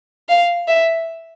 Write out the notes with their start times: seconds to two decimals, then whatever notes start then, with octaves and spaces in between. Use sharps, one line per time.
0.29 F5
0.68 E5